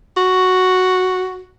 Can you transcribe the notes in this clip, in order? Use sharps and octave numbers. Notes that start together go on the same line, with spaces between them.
F#4